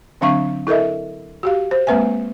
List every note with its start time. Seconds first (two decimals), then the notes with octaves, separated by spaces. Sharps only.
0.21 D3 F#3 C4 D4 F5 C#6
0.67 E4 A4 A#4 D#5 E5
1.43 F#4 G4 F5
1.71 C5
1.87 G#3 A#3 C4 B4 E5 G#5